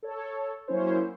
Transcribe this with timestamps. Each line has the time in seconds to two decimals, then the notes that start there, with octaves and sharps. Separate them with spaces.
0.03 A4 C#5
0.67 F#3 A#3 C#4 E4 C5 C#5